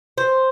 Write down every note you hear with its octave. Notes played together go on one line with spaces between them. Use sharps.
C5